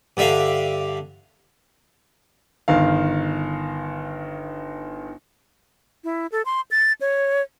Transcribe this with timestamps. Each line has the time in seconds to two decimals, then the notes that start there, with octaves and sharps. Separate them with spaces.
0.17 G2 D3 E5 F5
2.68 G1 D#3 F5
6.04 E4
6.32 A4
6.45 C6
6.71 A6
7.01 C#5